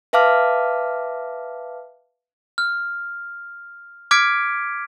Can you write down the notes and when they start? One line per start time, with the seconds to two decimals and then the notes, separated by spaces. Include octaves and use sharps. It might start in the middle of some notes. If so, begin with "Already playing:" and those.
0.13 B4 E5 F5 A5 D6 F6
2.58 F6
4.11 D6 F6 G#6 B6 C#7 D7